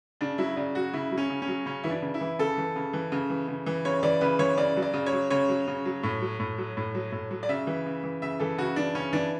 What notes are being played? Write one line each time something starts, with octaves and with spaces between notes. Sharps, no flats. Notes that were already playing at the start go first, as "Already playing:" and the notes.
C#3 D4
F#3 E4
C#3 D5
F#3 F#4
C#3 E4
F#3
C#4
C#3
C#4
F#3
C#3 C#4
E3 E4
D4
C#3
E4
E3
C#3 A4
E3
C#3
E3
C#3
E3
C#3
E3
C#3 C#5
E3 D5
C#3 B4
E3 C#5
C#3 D5
F#3
D5
C#3
C#5
F#3
C#3 C#5
F#3
C#3
F#3
A2
F#3
A2
F#3
A2
F#3
A2
F#3
D5
C#3 E5
E3
C#3
E3
C#3 E5
E3 A4
C#3 F#4
E3 D4
C#3 C#4
E3 D4